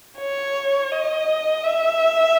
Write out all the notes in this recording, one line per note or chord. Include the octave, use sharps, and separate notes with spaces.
C#5
D#5
E5